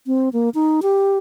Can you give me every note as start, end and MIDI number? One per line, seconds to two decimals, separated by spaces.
0.07 0.29 60
0.33 0.49 58
0.54 0.80 63
0.82 1.18 67